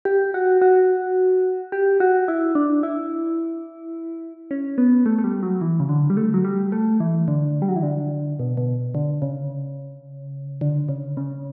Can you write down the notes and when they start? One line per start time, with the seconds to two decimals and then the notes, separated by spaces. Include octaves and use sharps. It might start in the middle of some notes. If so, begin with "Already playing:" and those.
0.05 G4
0.34 F#4
0.62 F#4
1.72 G4
2.00 F#4
2.28 E4
2.55 D4
2.83 E4
4.51 C#4
4.78 B3
5.06 A3
5.18 A3
5.24 G3
5.43 F#3
5.61 E3
5.80 C#3
5.89 D3
6.10 G3
6.17 A3
6.34 F#3
6.44 G3
6.72 A3
7.00 E3
7.28 D3
7.62 G3
7.69 F#3
7.76 E3
7.83 D3
8.39 B2
8.57 B2
8.95 D3
9.22 C#3
10.61 D3
10.89 C#3
11.17 C#3